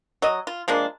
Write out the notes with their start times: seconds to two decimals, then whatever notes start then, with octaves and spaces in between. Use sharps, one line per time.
0.22 F#3 D#5
0.47 F4
0.68 F3 G#3 A#3 D4